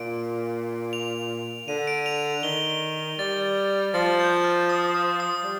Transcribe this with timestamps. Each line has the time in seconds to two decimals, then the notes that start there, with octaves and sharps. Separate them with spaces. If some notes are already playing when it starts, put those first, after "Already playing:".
Already playing: A#2 D7
0.93 F7
1.68 D3 D#7
1.87 D7
2.06 F7
2.25 F7
2.43 D#3 G7
3.19 G3 A6
3.94 F3 A6
4.20 G6
4.44 F6
4.69 D#6
4.94 D#6
5.20 D#6
5.44 G3